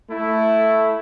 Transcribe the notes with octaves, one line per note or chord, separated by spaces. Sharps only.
A3 E4